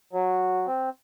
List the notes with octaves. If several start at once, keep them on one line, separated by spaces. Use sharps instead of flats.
F#3
C4